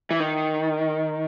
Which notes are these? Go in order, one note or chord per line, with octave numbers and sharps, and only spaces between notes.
E3
D#3